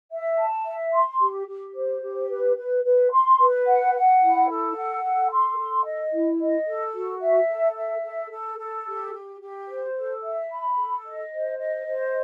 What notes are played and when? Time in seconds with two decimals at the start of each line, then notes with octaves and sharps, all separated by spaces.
0.11 E5
0.38 A5
0.65 E5
0.93 C6
1.20 G4
1.48 G4
1.75 C5
2.03 G4
2.29 B4
2.57 B4
2.84 B4
3.12 C6
3.39 B4
3.66 F#5
3.94 F#5
4.20 E4
4.48 A4
4.75 F#5
5.03 A4
5.31 C6
5.57 A4
5.85 D#5
6.12 E4
6.40 D#5
6.67 A4
6.94 F#4
7.21 E5
7.49 A4
7.76 E5
8.04 A4
8.31 A4
8.58 A4
8.86 G4
9.13 G4
9.41 G4
9.68 C5
9.95 A4
10.23 E5
10.50 B5
10.77 A4
11.05 D#5
11.32 C5
11.59 D#5
11.87 C5